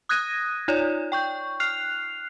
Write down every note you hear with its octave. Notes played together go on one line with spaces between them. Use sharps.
D#6 F#6 G#6 A#6 D#7
D#4 F4 C#5 D5
G5 C#6 G6
F6 F#6 C7 F7